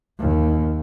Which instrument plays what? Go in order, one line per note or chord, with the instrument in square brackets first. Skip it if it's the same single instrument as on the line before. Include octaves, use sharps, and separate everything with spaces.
[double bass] D#2